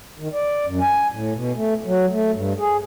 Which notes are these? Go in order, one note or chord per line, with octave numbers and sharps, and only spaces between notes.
D#3
D5
F#2
G#5
A2
B2
A3
F#3
A3
G2
G#4